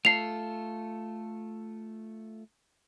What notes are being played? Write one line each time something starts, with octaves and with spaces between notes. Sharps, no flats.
A3 F4 A4 C7 F7